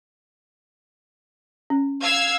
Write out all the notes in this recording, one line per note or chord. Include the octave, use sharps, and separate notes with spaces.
C#4
F5 E6 G#6